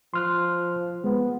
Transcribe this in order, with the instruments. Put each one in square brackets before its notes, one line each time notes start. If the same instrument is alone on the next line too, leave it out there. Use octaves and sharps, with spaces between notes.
[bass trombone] F3 [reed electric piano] C6 F6 F#6
[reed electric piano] G#3 [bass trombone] B3